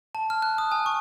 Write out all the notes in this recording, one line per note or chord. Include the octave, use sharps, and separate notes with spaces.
A5
F6
F#6
D#6
G#5
C#6